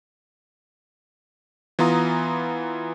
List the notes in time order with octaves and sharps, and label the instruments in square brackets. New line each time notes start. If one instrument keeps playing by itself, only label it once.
[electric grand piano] E3 B3 F4 A#5 D#6